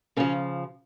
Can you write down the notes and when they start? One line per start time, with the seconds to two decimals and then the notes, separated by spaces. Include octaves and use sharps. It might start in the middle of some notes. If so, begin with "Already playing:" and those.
0.17 C#3 F3 C#4